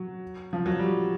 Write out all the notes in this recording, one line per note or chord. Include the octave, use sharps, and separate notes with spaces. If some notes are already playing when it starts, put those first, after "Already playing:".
Already playing: F#3
F3
F#3
G3